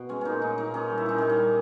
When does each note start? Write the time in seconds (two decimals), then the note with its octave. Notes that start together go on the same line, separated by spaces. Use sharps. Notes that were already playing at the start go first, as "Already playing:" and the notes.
Already playing: B2
0.09 G#3 C#4
0.21 A#2 C#4 D#4
0.42 A#2 D#4
0.58 A#2 D#4
0.74 A#2 C#4
0.90 G3
0.98 E4
1.06 A#2 D#4
1.18 G3 C#4
1.30 D#4
1.38 G3